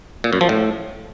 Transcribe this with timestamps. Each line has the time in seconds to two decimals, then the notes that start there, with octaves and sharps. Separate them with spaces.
0.24 A#2
0.33 F#2
0.41 F3
0.49 A2